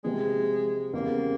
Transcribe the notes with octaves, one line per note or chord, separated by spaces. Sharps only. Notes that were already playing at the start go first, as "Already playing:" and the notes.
C3 F3 G#3 C4
E2 C#3 G3 A#3 C4